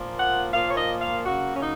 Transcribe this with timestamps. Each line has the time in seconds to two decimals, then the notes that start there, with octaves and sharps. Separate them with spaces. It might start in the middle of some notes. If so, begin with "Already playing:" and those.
Already playing: A#2 F3 A#3
0.18 F#5
0.53 A#2 F3 A#3 F5
0.68 C#5
0.77 D#5
1.01 F5
1.25 C#3 F#3 A#3 F#4
1.55 C#4
1.60 D#4